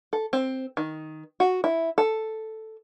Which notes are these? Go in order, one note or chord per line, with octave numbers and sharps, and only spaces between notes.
A4
C4
D#3
F#4
E4
A4